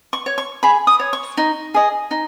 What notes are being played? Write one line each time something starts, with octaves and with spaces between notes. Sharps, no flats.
C#6
C#5
C#6
G#4 B5
D#6
C#5
C#6
D#4
G#4 D#5
D#4